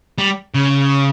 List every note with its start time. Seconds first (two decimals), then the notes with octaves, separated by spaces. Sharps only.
0.18 G3
0.55 C#3